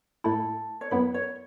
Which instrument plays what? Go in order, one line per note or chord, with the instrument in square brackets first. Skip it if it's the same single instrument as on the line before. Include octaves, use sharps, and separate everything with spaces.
[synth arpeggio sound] A2 A3 E4 [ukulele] A4
[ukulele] C#5
[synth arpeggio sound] F#2 F#3 B3 E4 [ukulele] B4
[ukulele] C#5